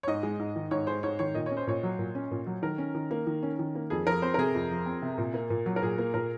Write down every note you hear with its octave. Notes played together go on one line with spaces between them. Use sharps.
C#5
G#2 D#5
G#3
G#2
D#3
G#2 C#5
G#3 C5
G#2 C#5
D#3 C#5
A#2 D#5
C#4 C#5
C5
A#2 C#5
F#3
A#2
C#4
A#2
F#3
D#3 A#4
C#4
D#3
A#3
D#3
C#4
D#3
A#3
F2 G#4
F3 A#4
C4 C5
A#4
C3 G#4
F2
F3
C4
C3
A#2
A#3
A#2
F#3
A#4
A#2 G#4
A#3
A#2 A#4